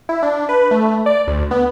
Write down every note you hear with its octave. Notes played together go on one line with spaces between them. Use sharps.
E4
D4
B4
A3
D5
D2
B3